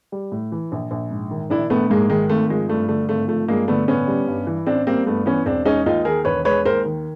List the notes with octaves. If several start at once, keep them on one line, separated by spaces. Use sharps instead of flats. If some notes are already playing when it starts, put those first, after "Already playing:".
G3
A2
E3
A#1
A#1
G#2
D#3
A#1 D4 E4
A#1 A3 B3
G#2 G#3 A#3
D#3 G#3
G#1 A3
F3 G#3
G2 A3
D3 A3
G#1 A3
F3 A3
G2 G#3 A#3
D3 A3 B3
A1 B3 C#4
G3
G2
E3
A1 C4 D4
G3 A#3 C4
G2 A3 B3
E3 B3 C#4
E1 C4 D4
G#3 C#4 D#4
D#2 D#4 F4
D#3 G#4 A#4
E1 B4 C#5
G#3 B4 C#5
D#2 A#4 C5
D#3